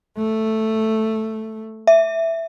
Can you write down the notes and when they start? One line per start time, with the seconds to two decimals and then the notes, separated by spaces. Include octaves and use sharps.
0.17 A3
1.87 E5